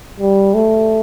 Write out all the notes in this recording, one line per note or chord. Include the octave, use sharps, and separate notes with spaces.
G3
A3